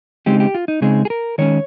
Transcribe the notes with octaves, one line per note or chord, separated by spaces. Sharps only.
C#3 G#3 C4 D#4 G4
G4
F4
D#4
C#3 G#3 C4 D#4 G#4
G#4
A#4
D#3 G#3 C#4 C#5